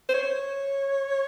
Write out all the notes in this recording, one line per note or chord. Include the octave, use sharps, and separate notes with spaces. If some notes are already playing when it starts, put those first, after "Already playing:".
C5
C#5